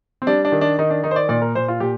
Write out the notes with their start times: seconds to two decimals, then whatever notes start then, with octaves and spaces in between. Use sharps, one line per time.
0.22 C4
0.27 G3 D4
0.45 D4
0.52 D#3
0.61 D4
0.78 D#3 D#4
0.90 D4
1.04 D#3 D#4
1.11 C5
1.16 D5
1.29 A#2 D5
1.42 A#4
1.55 A#2 C5
1.68 F4
1.80 A#2 G4